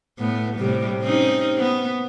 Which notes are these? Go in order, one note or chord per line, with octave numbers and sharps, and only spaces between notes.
A2 B3
A2 C3 G3
C4 C#4 D#4
B3